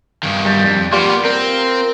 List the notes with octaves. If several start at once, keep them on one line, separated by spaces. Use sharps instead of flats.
G2 D#3
G3
F2
G3 A#3 B3 F4
C4 A#4